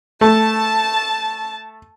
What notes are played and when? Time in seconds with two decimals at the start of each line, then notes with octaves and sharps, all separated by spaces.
0.21 A3 A5